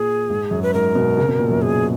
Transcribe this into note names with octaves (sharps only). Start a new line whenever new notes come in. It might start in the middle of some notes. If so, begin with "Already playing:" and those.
Already playing: A#2 G#4
G#2
F#2
B4
G#2 A#4
B2
C#3
B2
A#2
F#2
G#4